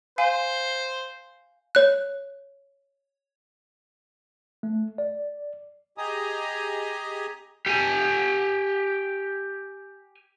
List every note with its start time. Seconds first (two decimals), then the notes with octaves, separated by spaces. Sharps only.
0.18 C5 F5 G#5
1.75 C#5 F#6
4.63 A3
4.98 D5
5.98 G4 G#4 D#5 G#5 A#5 D#6
7.66 G4 G#5